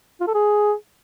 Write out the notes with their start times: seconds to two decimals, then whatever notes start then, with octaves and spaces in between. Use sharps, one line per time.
0.21 F4
0.27 A4
0.34 G#4